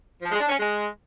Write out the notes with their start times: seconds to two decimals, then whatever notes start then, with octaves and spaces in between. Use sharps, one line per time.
0.22 F3
0.31 G#3
0.40 D4
0.49 C#4
0.58 G#3